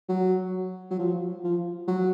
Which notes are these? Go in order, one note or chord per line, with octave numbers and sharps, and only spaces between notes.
F#3
F#3
F3
F3
F#3